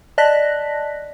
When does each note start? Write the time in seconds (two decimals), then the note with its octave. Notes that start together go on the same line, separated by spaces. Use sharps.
0.18 D5 D#5 A5 F#6 A#6 B6